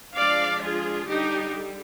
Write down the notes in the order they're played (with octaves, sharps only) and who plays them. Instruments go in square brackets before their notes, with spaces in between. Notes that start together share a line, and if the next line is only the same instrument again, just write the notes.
[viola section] F3 G#3 D4 D5 F5
F4 G#4
D3 G3 D4 D#4 G4